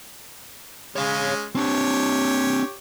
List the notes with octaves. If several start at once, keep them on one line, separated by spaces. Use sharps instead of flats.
G#3 C#4 C#5 F5
C4 D4 G4 C#5